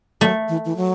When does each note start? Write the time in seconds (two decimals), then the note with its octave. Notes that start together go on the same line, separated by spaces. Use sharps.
0.21 F#3 A3
0.49 E3
0.65 E3
0.76 F#3